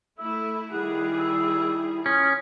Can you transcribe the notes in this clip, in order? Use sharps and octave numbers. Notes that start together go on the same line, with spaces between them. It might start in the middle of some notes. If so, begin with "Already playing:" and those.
A3 E4 E5
D#3 G3 E4 G#4 F#5
E6
C#4 F4 D#6